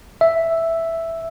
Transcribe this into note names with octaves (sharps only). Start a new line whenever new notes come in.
E5